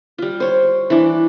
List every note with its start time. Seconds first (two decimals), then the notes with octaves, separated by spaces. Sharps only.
0.18 G3 F4
0.40 C5 C#5
0.90 E3 D4